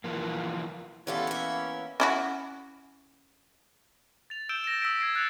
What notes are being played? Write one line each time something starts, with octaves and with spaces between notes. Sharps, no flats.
E3 F3 A#3
E3 G3 B3 C#4 F4 A4
A#3 E5
C#4 E4 F#4
A6 F7
E6 G6 D7 E7 G7
A#6 E7
D#6 E6 B6 D7
G#6 C7 D7
E6 F#6 A6 C7 C#7 F7